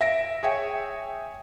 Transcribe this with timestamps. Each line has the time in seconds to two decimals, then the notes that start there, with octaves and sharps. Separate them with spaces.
0.01 E5 A#6 D7
0.43 G#4 C#5 E5 G5